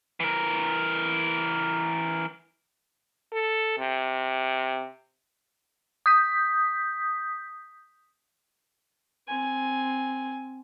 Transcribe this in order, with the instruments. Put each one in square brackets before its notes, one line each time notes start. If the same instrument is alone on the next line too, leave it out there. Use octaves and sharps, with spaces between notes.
[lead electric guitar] E3 A#4
[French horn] A4
C3
[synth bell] D#6 G6 B6
[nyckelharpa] C4 G#5